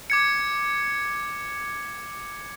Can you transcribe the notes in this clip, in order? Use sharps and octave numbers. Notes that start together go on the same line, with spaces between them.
D6 G#6 C#7